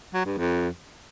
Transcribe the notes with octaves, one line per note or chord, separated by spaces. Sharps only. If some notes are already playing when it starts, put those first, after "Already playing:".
F#3
G2
F2